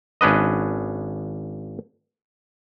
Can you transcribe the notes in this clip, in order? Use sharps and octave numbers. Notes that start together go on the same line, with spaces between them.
G#1 C#4 D4 B4 D#5